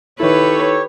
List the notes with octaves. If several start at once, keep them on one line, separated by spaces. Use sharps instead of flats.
D#3 E4 G4 A4 B4 C#5